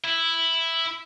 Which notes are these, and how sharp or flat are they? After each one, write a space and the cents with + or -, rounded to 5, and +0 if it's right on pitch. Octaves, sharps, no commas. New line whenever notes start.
E4 +0